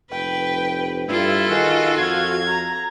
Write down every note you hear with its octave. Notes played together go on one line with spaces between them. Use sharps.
F1 B4 G5
G2 E4 F4 A4
D#3 F#4 G#4
F2 F#4 F5 G#6
A#5